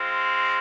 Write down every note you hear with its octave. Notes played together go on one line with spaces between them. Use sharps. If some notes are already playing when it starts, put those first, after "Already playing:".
Already playing: G#3 C4 F4